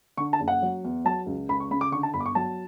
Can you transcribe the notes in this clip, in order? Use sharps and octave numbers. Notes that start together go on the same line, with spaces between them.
D3 C#6
A5
F#1
F#5
F#3
E2
F#3 A5
C#2
C#2 B5
C#6
C#3 B5
D6
D3 C#6
A5
G1 B5
D6
C#6
F#3 A5